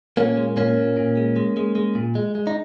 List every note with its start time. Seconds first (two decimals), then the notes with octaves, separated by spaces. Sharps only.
0.17 A#2 A#3 C#4
0.37 G#3
0.57 A#2 A#3 C#4
0.77 A#2
0.97 A#2
1.17 G#3
1.36 G#3
1.57 G#3
1.75 G#3
1.95 A#2
2.15 G#3
2.35 G#3
2.47 D#4